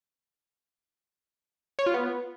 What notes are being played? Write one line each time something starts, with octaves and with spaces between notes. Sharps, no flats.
C#5
F4
B3